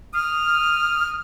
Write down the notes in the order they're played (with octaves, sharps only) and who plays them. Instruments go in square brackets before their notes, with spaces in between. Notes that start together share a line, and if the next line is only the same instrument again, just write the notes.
[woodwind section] D#6 F6